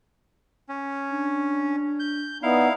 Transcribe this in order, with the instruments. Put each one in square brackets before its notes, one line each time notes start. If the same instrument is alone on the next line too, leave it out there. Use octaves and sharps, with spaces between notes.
[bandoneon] C#4
[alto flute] D4
[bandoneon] G6
[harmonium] B3 D#4 [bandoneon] E4 F5 [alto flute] D5